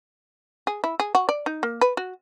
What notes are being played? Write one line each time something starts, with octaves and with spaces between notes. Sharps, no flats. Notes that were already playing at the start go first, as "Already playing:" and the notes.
G#4
E4
G#4
F#4
D5
D#4
A#3
B4
F#4